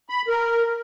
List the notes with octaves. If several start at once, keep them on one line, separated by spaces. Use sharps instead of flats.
B5
A#4